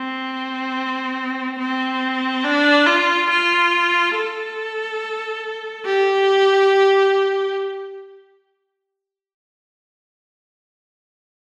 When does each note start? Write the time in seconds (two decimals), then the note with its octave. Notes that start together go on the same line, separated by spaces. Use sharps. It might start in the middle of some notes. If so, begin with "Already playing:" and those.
Already playing: C4
1.59 C4
2.44 D4
2.86 F4
3.30 F4
4.15 A4
5.85 G4